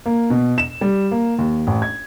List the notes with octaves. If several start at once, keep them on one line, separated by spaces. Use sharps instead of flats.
A#3
B2
E7
G3
A#3
D#2
A1
G#6